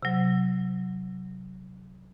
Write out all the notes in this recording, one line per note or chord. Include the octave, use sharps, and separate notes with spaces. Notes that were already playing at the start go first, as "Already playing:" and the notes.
C3 F#3